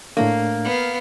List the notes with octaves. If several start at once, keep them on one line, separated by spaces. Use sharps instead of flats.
A2 A3 A#3 D4
B3 F5